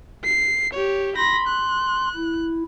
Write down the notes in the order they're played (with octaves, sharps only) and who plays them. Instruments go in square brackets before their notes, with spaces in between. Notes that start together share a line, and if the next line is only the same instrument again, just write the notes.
[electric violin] C7
G4 C#5
[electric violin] B5 A#6 [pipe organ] C6
[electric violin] F#6
[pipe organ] E4